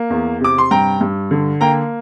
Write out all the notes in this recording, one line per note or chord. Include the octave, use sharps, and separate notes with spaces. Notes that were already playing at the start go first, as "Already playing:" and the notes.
Already playing: A#3
E2
C3 D6
C6
G2 G5 A#5
G2
D3
A#3 G5 A#5